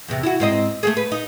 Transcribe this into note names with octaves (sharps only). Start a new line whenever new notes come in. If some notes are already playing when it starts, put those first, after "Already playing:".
E2 C3
E4 F#4
G#2 C4 D#5
A3 A#3 G#4
B4
D#4